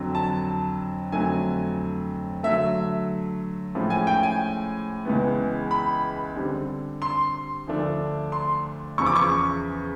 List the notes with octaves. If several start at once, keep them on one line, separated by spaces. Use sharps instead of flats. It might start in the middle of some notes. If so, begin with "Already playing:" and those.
Already playing: F2 D3 F#3
A5
F2 D3 F#3 A3 G#5
D3 F#3 A3 E5
A2 F3 G#3 C#4
G#5
G5
G#5
C#2 C#3 E3 G#3 B3
B5
D3 G3 C4
C6
D2 D3 F3 A3 D4
C6
E2 C#3 F3 C#6
D6
C#6